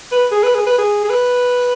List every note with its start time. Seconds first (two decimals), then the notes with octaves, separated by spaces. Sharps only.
0.11 B4
0.31 G#4
0.43 B4
0.55 G#4
0.66 B4
0.78 G#4
1.04 G#4
1.10 B4